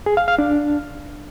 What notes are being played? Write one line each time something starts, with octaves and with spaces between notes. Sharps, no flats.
G#4
F5
F5
D4